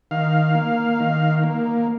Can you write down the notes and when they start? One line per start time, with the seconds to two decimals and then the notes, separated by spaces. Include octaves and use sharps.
0.11 D#3 F5
0.55 A#3
1.00 D#3
1.43 A#3